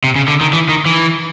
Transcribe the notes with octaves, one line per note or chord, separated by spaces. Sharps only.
C3
C#3
D3
D#3
E3
D#3
E3